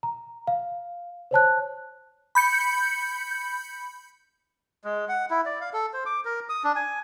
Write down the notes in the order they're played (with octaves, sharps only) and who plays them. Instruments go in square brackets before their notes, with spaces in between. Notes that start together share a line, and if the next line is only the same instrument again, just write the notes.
[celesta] A#5
F5
C5 C#5 A5 F#6
[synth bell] B5 G6 C#7
[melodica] G#3
F#5
E4
D5
F5
A4
C5
D6
A#4
D#6
D4
G#5